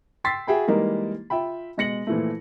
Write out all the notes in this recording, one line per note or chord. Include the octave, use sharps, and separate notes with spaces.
G5 C6 E6 A6 B6 C7
F#4 G#4 E5 G5 G#5 B5
E3 G3 G#3 A#3 D#4 A#4
F4 E5 G5 B5
B2 G#3 A#6 C#7 F#7
A#2 E3 F3 A3